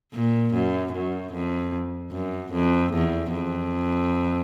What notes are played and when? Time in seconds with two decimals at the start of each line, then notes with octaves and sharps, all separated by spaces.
0.13 A#2
0.54 F#2
0.92 F#2
1.33 F2
2.12 F#2
2.52 F2
2.93 E2
3.33 F2